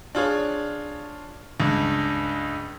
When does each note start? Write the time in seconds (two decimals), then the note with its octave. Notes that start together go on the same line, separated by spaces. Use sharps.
0.15 D4 F4 G#4 C#5
1.60 C#2 G2